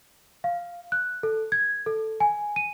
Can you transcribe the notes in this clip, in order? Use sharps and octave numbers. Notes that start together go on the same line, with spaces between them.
F5
F#6
A4
G#6
A4
G#5
D#7